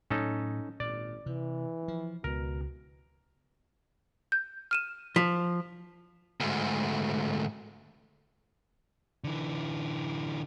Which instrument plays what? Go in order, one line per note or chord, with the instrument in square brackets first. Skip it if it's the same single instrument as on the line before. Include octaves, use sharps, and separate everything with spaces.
[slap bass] A2 F#3 [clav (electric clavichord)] C#4 D#4 A4
[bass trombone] G#1 [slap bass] A#2 [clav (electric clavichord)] D5
[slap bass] C3 [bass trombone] E3
[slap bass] F3
[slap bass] C#2 [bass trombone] B2 [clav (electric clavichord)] A#4
[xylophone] G6
F6 D#7 E7
[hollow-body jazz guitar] F3 [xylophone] B6
[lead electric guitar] D2 G#2
D3 E3